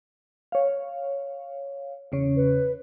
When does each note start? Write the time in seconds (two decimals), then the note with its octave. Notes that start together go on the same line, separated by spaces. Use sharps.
0.52 C#5 F5
2.12 E2 C#3 C#5
2.36 B4